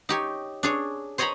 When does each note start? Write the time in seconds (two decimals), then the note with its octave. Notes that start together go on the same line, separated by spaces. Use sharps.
0.09 D#4 G4 C#5
0.63 D4 G#4 C#5
1.18 C5 C#5 D#5 G#5 A#5 B5